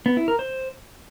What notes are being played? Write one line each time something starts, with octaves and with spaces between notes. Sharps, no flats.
B3
E4
A#4
C5